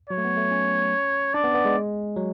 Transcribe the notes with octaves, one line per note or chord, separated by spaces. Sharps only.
F#3 C#5
A3
B3
A3
C#4
D4 D5
B3
B3
G#3
F#3